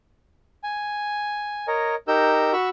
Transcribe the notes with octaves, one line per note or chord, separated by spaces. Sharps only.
G#5
A#4 C#5 D#5
D#4 G4 A#4 E6 G6
F#4 B5 C#6 E6